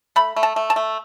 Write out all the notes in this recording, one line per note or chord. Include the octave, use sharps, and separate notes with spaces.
A3 B5
A3
A5
A3
A5
A3